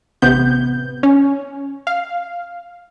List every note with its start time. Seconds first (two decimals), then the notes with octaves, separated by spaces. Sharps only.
0.22 A1 C3 B3 G6
1.03 C#4
1.87 F5